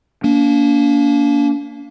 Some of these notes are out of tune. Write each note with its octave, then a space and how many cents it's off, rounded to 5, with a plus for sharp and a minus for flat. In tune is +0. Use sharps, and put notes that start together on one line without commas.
A#3 +0 D4 -40